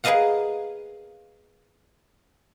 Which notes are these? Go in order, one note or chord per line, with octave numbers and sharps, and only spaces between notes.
G#4 A#4 B4 D#5 F5 F#5